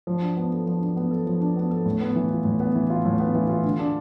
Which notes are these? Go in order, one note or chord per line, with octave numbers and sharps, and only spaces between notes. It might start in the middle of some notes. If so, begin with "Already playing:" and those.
F3
D4
B3
A4
F3
D4
B3
A4
F3
D4
B3
A4
A2
B3
E3
F4
A2
B3
E3
F4
A2
B3
E3
F4
D3
D4